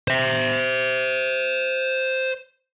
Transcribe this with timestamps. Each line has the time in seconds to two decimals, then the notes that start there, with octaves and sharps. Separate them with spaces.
0.08 C5 E5